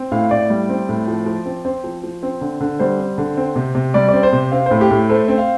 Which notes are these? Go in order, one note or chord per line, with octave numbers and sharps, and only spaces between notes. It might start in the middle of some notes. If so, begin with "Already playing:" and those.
Already playing: C4
A2 F5
A2 D5
G3
C4
A2
F3
F3
C4
C4 C5
F3
F3
C4
D3
D3
G3 C5
C4
D3
C4
C3
C3
G3 D5
C4 D5
C5
C3
C4 F5
A2 C5
G4
A2
A3 C5
C4
F5